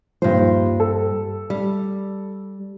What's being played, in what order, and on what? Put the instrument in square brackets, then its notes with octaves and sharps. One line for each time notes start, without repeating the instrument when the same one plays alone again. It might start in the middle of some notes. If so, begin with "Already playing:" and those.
[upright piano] D#1 F3 [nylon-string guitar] G2 C5
[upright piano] A4
[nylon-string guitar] G3